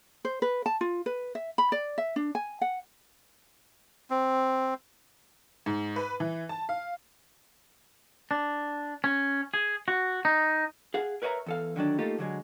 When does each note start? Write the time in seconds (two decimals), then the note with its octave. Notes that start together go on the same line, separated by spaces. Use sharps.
0.25 C5
0.42 B4
0.66 A5
0.81 F4
1.06 B4
1.35 E5
1.58 B5
1.72 D5
1.98 E5
2.16 D4
2.35 G#5
2.61 F#5
4.10 C4
5.66 G#2
5.96 B4
6.20 E3
6.49 A5
6.69 F5
8.31 D4
9.04 C#4
9.54 G#4
9.88 F#4
10.25 D#4
10.94 G#4 F5 F#5
11.22 A#4 B4 C#5 D#5 E5 A#5
11.46 E2 A4 F5
11.76 D3 D#3 F#3 D4
11.99 A3 A#3 D#4 F4 G4 A4
12.19 D3 F#3 G#3